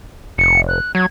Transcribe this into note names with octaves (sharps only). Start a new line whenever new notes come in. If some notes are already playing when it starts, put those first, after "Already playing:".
F1 C#7
F#6
F#3 G#6